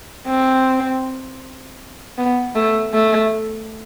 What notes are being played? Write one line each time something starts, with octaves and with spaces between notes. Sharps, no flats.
C4
B3
A3
A3